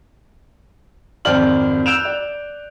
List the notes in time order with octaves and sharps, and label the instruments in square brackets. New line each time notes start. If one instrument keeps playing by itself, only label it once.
[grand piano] G#1 F2 C5 D5 F6 F#7
E6 F#6 G6 D7 E7 F7
D5